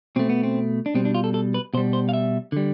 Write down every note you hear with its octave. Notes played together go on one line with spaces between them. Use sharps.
B2 A3 C4
B3
C4
D4
B2 G3 C4
D4
F4
A4
A4
B4
B2 G3 C5
C5
F5
E5
D3 G3